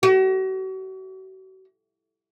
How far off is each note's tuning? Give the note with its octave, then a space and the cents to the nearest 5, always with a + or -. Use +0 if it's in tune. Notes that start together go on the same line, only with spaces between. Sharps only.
F#4 +40